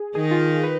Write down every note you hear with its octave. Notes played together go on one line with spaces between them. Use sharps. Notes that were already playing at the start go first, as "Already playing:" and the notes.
Already playing: G#4
D#3 D#4 G#4
F4
B4